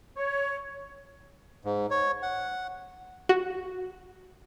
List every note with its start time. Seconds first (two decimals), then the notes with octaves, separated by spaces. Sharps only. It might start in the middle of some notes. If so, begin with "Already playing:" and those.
0.16 C#5
1.65 G#2
1.91 C#5
2.22 F#5
3.29 F#4